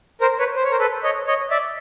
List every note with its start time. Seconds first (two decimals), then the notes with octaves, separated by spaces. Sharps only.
0.21 A#4 C5
0.39 B4 C#5
0.56 C5
0.64 C#5
0.71 A#4 C5
0.79 A4 B4
1.03 C#5 D#5
1.27 C#5 D#5
1.51 D5 E5